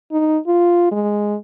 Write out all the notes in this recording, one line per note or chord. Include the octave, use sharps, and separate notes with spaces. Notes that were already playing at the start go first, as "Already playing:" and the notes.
D#4
F4
G#3